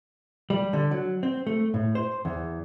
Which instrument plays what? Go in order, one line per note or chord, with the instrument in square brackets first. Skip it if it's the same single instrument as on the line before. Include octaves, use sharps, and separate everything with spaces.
[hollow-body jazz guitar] G3
D3
F#3
C4
A3
A2
C5
E2